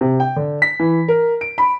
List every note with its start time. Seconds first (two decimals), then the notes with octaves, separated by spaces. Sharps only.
0.01 C3
0.20 G5
0.36 D3
0.62 B6
0.79 E3
1.08 A#4
1.41 D7
1.58 B5